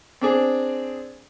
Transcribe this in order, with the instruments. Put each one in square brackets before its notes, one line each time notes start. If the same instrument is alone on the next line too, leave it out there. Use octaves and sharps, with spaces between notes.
[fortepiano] C4 D4 G#4